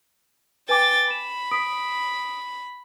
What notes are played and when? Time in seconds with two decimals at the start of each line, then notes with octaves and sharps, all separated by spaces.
0.69 B4 G5 G#5 D6 A6
1.11 B5 E7
1.51 D#6 B6 D7